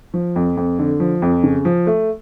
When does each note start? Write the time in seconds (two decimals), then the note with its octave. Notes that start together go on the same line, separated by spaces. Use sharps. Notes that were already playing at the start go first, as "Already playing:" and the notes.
0.14 F3
0.36 F2
0.57 F2
0.79 D3
1.00 F3
1.22 F2
1.43 C#3
1.65 F3
1.87 A3